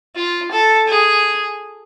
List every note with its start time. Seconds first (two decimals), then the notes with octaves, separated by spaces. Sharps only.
0.16 F4
0.52 A4
0.88 G#4